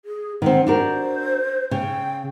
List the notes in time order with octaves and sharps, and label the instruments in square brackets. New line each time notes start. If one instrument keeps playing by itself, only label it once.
[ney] G#4
[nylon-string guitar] D#3 C4 [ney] F#5
[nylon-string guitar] D4 F#4 A#4 [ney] C5
[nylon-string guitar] C#3 [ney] G5